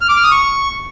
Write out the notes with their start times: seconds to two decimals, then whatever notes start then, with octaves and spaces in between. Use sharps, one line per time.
0.01 F6
0.09 D6
0.16 F6
0.24 D#6
0.31 C#6